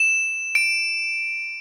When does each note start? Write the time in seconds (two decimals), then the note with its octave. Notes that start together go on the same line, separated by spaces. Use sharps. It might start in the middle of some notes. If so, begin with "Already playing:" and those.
Already playing: E7
0.55 D7